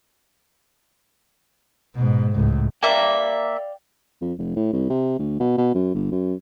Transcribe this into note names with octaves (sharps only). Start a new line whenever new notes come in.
G#2 B2
C#2 A2
A#3 D5 E5 F5 G5
F2
F1
A2
C2
C3
D2
B2
B2
F#2
G1
F#2